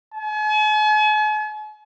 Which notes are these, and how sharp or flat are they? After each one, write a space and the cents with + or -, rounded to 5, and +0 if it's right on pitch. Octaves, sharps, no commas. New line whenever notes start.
G#5 +45